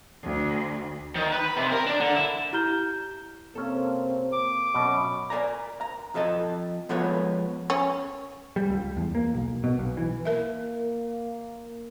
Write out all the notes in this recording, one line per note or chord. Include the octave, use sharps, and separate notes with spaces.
D2
D#3
B4
B5
C3
A#4
D4
D3
E4
E4 G4 A#5 F6 G6 G7
C3 A#3 C4 C#4 A4
D6
F#2 B2
A#4 D5 G#5 A#5
A#5
F2 F3 A4 D#5 A5
F3 G#3 B3 A4 B4 C#5
C#4
G3
C#2
E2
A#3
B1
B2
B1
E3
A#3 A#4 E5